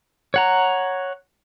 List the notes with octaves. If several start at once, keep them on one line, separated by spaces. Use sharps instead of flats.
C#5 F#5 A#5